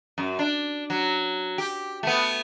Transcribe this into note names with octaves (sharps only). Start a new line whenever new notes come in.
F#2
D4
F#3
G4
A3 B3